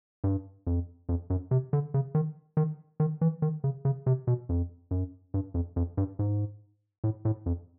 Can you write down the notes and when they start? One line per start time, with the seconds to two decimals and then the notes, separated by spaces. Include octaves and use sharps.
0.24 G2
0.67 F2
1.09 F2
1.30 F#2
1.51 C3
1.73 D3
1.94 C#3
2.15 D#3
2.57 D#3
3.00 D#3
3.21 E3
3.42 D#3
3.64 C#3
3.85 C#3
4.06 C3
4.27 B2
4.49 F2
4.91 F#2
5.34 G2
5.54 F2
5.76 F2
5.97 G2
6.19 G#2
7.04 A2
7.25 A2
7.46 F2